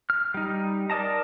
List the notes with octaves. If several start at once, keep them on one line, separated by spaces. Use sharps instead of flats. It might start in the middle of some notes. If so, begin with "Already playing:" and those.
F6
G3 D#4
A#4 D5 D#5 A5 A#5